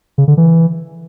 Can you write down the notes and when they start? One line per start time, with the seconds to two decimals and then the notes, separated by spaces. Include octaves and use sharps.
0.18 C#3
0.28 D3
0.37 E3